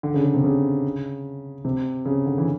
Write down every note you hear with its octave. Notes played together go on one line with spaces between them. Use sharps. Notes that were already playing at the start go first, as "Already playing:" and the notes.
D3
C#3
C#3
C3
C#3
C3
C#3
D3
E3